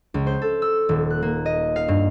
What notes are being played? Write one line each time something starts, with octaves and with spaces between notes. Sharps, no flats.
C#2
C5
A4
E6
D#1
F#6
A#3
D#5
F5
G2